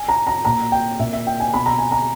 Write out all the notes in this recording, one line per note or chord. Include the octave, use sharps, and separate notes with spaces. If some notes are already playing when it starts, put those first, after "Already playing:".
Already playing: G#5
A#5
A#5
A#2 A#5
G5
A#2 E5
E5
G5
G#5
B2 B5
A#5
G#5
A#5